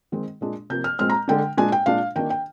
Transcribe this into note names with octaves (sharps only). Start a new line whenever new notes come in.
D#3 G#3 C4
A#2 G#3 D4
C3 F3 A#3 G6
F6
A#2 G#3 C4 F6
A#5
D3 G#3 D4 G5
A#2 G#3 D4 G#5
G5
A#2 G#3 D4 F5
D#3 A#3 D4 G5
G5